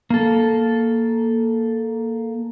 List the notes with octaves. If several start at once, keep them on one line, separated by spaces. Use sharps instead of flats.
A#3 A4